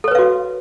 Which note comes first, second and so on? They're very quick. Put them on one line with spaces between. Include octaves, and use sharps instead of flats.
A4 C#5 B4 F5 F#4